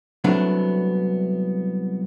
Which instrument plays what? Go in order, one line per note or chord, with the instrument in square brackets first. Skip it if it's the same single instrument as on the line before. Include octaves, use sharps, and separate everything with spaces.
[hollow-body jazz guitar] C2 F#3 A3 B3 D4